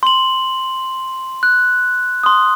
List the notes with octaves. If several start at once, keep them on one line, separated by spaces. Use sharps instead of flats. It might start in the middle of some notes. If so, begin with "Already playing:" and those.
C6 F#7
F#6
C6 D#6